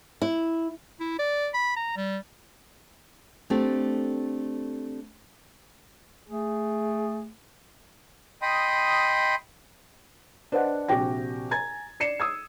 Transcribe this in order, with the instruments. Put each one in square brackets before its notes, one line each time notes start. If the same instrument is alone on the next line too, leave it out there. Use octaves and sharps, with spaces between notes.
[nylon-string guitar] E4
[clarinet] E4
D5
B5
A#5
G3
[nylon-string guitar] A3 C4 D4 G4
[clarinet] A3 [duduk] G#4
[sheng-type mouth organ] D#5 G5 B5 C6 D#6
[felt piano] D4 B4 C5 D#5 F#5
A#1 C3 F#4 G4 G5 A#6
G#5 A#5 G#6 A6
D5 C7 C#7 E7
D#6 E6 G#6